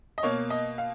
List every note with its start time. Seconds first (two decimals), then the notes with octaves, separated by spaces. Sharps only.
0.18 D#5
0.23 B2 A#3 C#5
0.50 D#5
0.78 F5